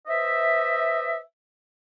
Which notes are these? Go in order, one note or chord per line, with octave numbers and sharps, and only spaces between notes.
B4 C5 D#5 E5